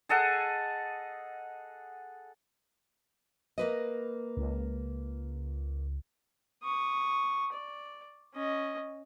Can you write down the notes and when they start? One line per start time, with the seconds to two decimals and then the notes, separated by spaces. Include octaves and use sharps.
0.09 G#4 A4 D#5 F#5
3.58 A#3 B4 D#5
4.37 C#2
6.63 C#6 D#6
7.53 D5
8.34 C#4 D#5